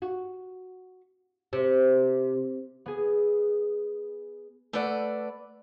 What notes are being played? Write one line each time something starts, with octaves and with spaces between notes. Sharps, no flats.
F#4
C3
B3 G#4
A3 A4 B4 D5 F#5